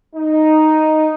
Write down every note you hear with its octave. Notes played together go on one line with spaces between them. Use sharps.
D#4